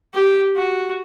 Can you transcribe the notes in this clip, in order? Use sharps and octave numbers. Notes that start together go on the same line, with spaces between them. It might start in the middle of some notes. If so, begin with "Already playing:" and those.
G4
F#4